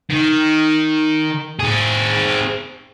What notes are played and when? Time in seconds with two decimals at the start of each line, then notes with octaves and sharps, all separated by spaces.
0.10 D#3
1.59 C4 G#4